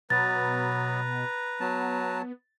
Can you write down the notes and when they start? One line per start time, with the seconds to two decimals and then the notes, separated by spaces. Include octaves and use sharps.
0.10 B2 F#3 B3 B4 A#5 A6
1.60 F#3 B3 A5